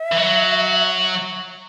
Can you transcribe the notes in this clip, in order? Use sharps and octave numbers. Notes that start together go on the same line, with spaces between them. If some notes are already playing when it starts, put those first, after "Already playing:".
Already playing: E5
E3
F#3